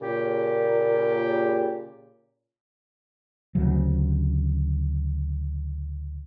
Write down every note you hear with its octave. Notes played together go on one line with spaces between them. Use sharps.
A#2 C#3 G4
D2 C#3 F#3